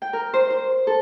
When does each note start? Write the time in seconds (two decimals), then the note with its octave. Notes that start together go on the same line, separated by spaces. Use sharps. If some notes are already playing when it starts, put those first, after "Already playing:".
0.02 G5
0.13 A#4
0.34 C5
0.50 C5
0.87 A4